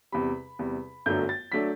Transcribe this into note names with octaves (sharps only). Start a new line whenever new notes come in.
E2 C3 G3 B5
E2 C3 G3
G1 F#2 F#3 A3 D4 G6
A6
F#3 A3 D4 B6